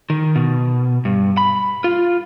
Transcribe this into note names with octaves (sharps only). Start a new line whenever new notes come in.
D#3
B2
G2
B5
F4